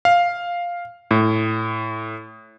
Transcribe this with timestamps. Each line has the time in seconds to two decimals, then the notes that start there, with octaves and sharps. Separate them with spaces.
0.05 F5
1.11 A2